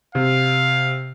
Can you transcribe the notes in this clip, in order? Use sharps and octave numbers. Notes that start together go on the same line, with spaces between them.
C3 F5